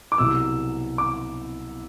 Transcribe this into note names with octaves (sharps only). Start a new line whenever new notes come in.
D6
C2 B2 F#3 E6
D6